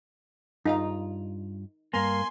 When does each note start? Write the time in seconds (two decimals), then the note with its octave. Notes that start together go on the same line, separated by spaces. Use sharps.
0.66 G2 D#4 F4 F5
1.94 G2 A#3 G#5 C6